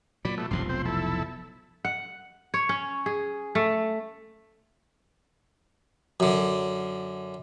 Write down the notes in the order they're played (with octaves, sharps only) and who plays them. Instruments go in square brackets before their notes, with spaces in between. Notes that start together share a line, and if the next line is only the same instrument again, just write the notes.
[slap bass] A#2 F#3 [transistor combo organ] D5 B5
[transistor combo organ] B2 A3
[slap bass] F1 B1 F3 [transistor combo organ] G2 C6
[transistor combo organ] C4 C5
E4 A4
[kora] F#5
C#5
C#4
G#4
A3
[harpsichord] F#2 D3